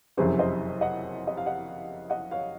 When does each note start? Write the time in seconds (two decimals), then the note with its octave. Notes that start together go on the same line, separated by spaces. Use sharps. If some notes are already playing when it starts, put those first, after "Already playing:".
0.17 F#1 F2 C3 F#3 C#4 G#4 C5
0.39 C5 D#5
0.81 D#5 F#5
1.27 D#5
1.37 F5
1.46 D#5 F#5
2.10 D#5 F#5
2.31 C#5 F5